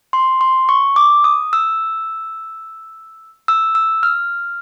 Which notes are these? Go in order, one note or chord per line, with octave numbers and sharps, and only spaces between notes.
C6
C6
C#6
D6
D#6
E6
E6
E6
F6